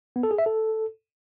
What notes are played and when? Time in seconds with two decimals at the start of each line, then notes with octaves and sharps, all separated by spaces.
0.16 B3
0.23 A4
0.31 G#4
0.38 E5
0.46 A4